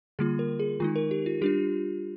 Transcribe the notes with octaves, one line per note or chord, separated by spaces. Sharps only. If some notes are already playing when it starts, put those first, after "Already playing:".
D3 G3 A#3 F4 G#4
A#4
G#4
D#3 G#3 D#4 F4
A#4
G4
F4
G3 D4 F4 G4